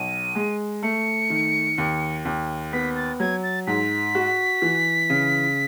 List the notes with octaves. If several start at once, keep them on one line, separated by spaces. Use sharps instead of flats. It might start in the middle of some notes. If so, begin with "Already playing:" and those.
Already playing: B1 D#7
G#3
A3 C#7
D#3
D#2
D#2
B3 B6
A6
F#3 G#6
A6
G#2 B6
F#4
E3
C#3